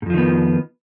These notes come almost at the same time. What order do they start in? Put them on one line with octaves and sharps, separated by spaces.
G#2 F2 F3 D#3 B3